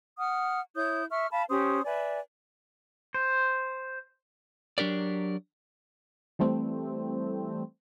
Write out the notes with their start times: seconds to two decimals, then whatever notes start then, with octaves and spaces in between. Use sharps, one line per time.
0.19 F#5 D#6 F6
0.75 E4 C#5 D#6 G6
1.10 E5 C#6 F6
1.31 F5 A5 B5
1.49 C#4 G4 C5 D#6
1.85 B4 D5 E5 G#5
3.14 C5
4.78 F#3 D4 G4 A#4 D5
6.39 E3 G3 A3 C4